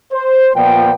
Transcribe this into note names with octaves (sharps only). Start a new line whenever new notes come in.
C5
A#2 F3 B3 D5 G5